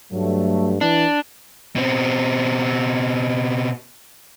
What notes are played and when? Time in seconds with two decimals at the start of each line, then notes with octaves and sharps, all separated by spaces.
0.12 G2 F#3 A3
0.81 E3 D4
1.76 B2 C4